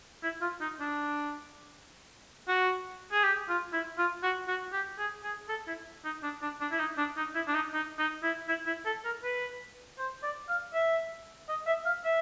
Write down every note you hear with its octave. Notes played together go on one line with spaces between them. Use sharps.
E4
F4
D#4
D4
F#4
G#4
G4
F4
E4
F4
F#4
F#4
G4
G#4
G#4
A4
E4
D#4
D4
D4
D4
E4
D#4
D4
D#4
E4
D4
D#4
D#4
D#4
E4
E4
E4
A4
A#4
B4
C5
D5
F5
E5
D#5
E5
F5
E5